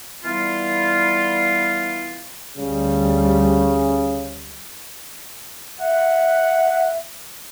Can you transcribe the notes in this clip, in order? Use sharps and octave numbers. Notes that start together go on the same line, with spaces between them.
E3 G3 B3 F4
D2 C#3 G3
E5 F#5